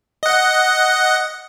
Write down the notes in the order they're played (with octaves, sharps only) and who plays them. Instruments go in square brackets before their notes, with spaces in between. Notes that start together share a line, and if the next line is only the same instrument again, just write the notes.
[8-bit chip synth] D#5 F#5